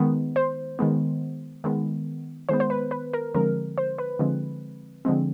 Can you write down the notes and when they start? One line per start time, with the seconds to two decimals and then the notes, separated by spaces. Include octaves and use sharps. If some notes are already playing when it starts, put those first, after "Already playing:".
Already playing: D#3 G#3 B3
0.36 C5
0.79 D#3 G#3 B3
1.64 D#3 G#3 B3
2.49 D#3 G#3 B3 C5
2.60 C5
2.70 B4
2.91 B4
3.13 A#4
3.34 D3 F3 G#3 C4 A#4
3.78 C5
3.98 B4
4.19 D3 F3 G#3 C4
5.05 D3 F3 G#3 C4